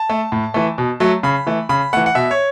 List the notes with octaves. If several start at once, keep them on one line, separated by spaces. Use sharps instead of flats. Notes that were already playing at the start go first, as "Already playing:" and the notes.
Already playing: A5
A3
A2
E3 A3
B2
F#3 A3
C#3 B5
E3 A3
C#3 B5
E3 A3 F#5
F#5
B2 E5
C#5